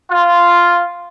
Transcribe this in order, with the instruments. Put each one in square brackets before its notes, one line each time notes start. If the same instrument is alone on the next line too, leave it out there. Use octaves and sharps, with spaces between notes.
[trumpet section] F4